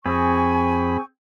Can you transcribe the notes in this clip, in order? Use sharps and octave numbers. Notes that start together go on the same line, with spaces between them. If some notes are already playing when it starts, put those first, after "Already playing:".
F2 C4 G#4 G#5 B5 C#6